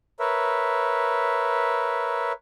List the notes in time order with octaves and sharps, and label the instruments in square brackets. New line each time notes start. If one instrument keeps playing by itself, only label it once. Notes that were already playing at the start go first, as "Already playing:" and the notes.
[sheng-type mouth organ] A#4 B4 C#5 E5